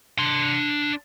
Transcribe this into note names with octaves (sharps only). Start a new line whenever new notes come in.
D4 C6